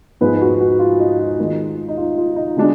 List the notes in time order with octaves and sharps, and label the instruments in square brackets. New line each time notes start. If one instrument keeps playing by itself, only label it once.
[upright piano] G#2 F3 G#3 D#4 [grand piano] B4
[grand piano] F#4
F#4
F4
D#4
F4
[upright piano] D#3 G#3 D#4
[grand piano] D#4
F4
F4
D#4
[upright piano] D3 G#3 D4 [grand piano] F#4